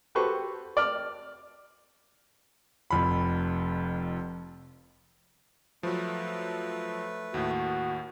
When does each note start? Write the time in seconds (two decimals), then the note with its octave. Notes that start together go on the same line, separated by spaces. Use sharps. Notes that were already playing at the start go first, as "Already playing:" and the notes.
0.15 F#4 G4 A4 B4 C5 C#6
0.77 D5 F6
2.90 F1 F2 B5
5.83 F3 F#3 A3 B4
7.34 D#2 A2 F#4